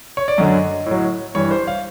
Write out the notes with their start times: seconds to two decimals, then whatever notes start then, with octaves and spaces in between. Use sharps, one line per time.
0.17 C#5
0.28 D5
0.38 F#2 D3 F#3 D#5
0.86 A2 F#3
1.35 G2 E3 C#5
1.51 C5
1.67 F5